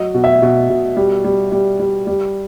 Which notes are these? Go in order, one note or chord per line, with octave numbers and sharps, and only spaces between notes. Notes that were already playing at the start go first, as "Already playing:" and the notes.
Already playing: F#3 D#5
B2
E5
B2
B2
G3
G3
G3
G3
G3